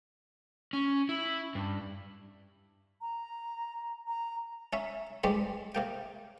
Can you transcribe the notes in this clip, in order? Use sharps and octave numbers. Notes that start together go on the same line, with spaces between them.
C#4
E4
G2
A#5
A#5
C#4 E5
G2 G3 G#3 C4 G4
C3 A#3 G5